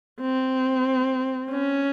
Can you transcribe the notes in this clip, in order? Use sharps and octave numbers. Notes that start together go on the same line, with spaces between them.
C4
C#4